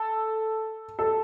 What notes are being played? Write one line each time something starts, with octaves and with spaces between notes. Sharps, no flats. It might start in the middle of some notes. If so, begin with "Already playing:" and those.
Already playing: A4
A4